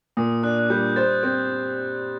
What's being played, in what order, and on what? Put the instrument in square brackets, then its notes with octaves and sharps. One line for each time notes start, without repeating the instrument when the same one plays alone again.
[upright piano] A#2 [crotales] D#6
[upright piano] D4 [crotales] F#6
[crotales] F#6
[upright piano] G3 [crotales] G6
[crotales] G6
[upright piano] C5 [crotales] A6
[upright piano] C4 [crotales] G6